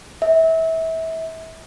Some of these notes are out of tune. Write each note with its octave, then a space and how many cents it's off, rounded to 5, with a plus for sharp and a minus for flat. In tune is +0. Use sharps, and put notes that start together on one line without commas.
E5 -25